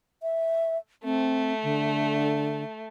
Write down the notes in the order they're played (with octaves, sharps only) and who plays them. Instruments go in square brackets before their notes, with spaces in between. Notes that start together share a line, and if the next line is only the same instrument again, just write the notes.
[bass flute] E5
[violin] A3 [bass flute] C4
[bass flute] D3